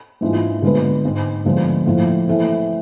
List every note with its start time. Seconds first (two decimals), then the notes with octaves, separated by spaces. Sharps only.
0.21 G#2 E3 G#3 D4 F4
0.62 D3 G#3 B3 F4 B4
1.03 G#2 G#3 C4
1.45 D2 D3 F3 G#3 B3
1.86 A2 F3 A3
2.27 E3 A3 C4